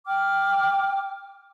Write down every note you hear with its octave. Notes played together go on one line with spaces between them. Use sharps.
G5 D6 F6